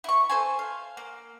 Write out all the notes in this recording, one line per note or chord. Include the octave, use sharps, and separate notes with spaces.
E4 C#6
A4 C5 G#5
F5
A#3